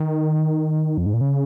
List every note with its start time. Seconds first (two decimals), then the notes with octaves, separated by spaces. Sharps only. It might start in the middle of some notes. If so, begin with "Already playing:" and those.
Already playing: D#3
0.98 F2
1.06 G#2
1.14 A#2
1.21 C#3